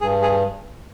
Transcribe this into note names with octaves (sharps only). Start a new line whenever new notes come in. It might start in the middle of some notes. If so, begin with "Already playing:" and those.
G2 G#4
G#4